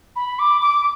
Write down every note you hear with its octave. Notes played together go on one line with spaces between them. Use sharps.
B5
D6
D6